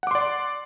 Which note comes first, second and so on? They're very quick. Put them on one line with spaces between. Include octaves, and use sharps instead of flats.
F#5 D6 C6 D5